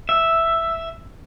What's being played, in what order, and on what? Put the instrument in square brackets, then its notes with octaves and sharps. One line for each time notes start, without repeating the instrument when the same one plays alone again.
[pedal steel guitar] E5